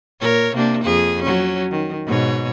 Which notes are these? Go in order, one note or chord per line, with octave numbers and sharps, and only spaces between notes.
A#2 A#4 C#5
C3 A#3 D4
F2 G#4
F#3 C#4
D#3
G#2 B2 C#5